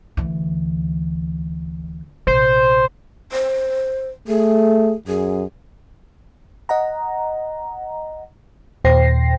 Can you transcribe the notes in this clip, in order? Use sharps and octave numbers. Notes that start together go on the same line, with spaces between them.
D2 E3
A#1 C3 C5
C5
A3 G#4
F#2 G#4
D#5 F#5 A#5
D#2 A#2 C5 G5 A#6 C7